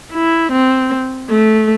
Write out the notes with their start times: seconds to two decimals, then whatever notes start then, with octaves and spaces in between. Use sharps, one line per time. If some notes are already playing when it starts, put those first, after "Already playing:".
0.12 E4
0.52 C4
1.29 A3